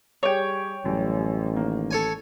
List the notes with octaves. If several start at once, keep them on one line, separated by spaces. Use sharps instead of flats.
G3 G4 G#4 C#5 G5
A1 F#2 G3
D#3 A#3
A4 C#5 G#5